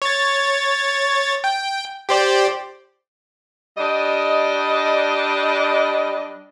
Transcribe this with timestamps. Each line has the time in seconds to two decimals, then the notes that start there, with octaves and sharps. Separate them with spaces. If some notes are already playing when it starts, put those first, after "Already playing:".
0.02 C#5 A6
1.44 G5
2.09 G4 C5 D5
3.78 G3 D4 D#5